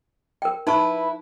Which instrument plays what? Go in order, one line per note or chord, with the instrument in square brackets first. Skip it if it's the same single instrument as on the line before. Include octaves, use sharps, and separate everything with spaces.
[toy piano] A#4 G5
[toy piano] D#4 A5 C#6 [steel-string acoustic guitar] E4 B4